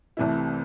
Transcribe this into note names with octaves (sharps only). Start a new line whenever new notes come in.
C2 C3 E3 A3 E4